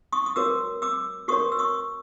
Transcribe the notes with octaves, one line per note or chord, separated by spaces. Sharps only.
C#6 D#6
D#6
F#4 A#4 C#5 D6 E6
D6 E6
F#4 A#4 C#5 C#6 D#6
E6
C#6 D#6